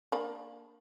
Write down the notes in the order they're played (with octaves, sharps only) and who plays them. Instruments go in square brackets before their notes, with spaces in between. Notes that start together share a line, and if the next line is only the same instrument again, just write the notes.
[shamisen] A#3 D4 B5